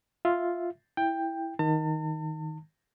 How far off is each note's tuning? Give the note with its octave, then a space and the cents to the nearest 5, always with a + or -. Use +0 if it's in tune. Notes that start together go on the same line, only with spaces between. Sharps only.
F4 +0 E5 +0
E4 +0 G5 +10
D#3 +10 A5 +40